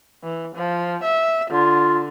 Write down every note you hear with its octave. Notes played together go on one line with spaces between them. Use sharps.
E3
F3
E5
D3 F4